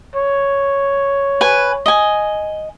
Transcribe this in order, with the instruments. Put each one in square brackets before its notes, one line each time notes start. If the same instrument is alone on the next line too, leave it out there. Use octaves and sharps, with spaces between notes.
[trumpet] C#5
[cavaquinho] B4 G#5
D#5 G#5